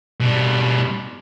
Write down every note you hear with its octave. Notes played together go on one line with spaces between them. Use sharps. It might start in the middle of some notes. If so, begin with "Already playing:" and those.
B2 G3